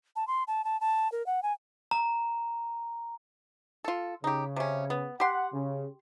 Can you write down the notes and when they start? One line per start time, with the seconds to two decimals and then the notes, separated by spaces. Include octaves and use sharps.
0.16 A5
0.27 C6
0.48 A5
0.65 A5
0.81 A5
1.12 A#4
1.26 F#5
1.43 G#5
1.91 A#5
3.84 F4 A4
4.24 C#3 D#4 G4
4.56 C3 C#4
4.90 B3
5.20 G4 F#5 C6
5.53 C#3